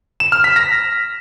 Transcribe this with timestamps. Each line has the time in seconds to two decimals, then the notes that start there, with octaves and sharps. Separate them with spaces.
0.20 E7
0.32 F6
0.44 B6
0.56 A#6